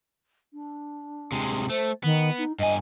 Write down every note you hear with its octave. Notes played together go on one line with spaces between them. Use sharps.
D4
C3 G#3
A3 C5
D#3 B3
D#4
G2 D#5 G#5